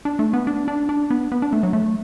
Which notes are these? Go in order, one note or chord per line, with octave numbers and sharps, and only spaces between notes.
D4
A3
B3
D4
D4
D4
B3
B3
D4
A3
F#3
A3